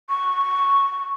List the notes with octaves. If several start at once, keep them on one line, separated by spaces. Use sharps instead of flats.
C#6